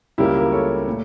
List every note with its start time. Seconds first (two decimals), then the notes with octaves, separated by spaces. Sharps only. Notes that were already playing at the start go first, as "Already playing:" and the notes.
0.18 C#2 C#3 G3 A#3 E4 G4
0.36 G4 A#4
0.52 A4 C#5
0.86 A#2 A3